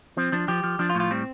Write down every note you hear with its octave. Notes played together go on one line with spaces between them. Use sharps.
F3 C4
F3 D4
F3 G4
F3
F3 D4
F4
A2
F4
G3 C4